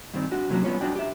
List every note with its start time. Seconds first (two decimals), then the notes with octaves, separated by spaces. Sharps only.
0.14 G2 D#3 C4
0.31 D4 F#4
0.50 C3 F#3 A#3 C#4 F#4
0.64 G3 B3 C#4 F4 C#5
0.81 D4 F#4 D5 G5
0.95 G4 E5